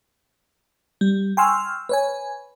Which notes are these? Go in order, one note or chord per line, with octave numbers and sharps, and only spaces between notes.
G3
G5 G#5 C6 C#6 E6 F6
B4 C#5 G#5